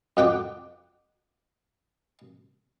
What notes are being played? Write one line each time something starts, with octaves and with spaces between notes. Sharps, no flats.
F2 F#5 G5 D6